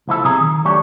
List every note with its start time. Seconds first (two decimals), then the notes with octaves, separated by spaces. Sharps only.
0.08 C#2 F3 E4 A4
0.23 B1 C3 G#4 A#5
0.41 D#3
0.65 F#3 A3 D4 G4 C#5